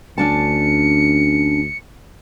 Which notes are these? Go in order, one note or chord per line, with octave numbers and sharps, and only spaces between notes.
D2 C#4 D4 A5 C#7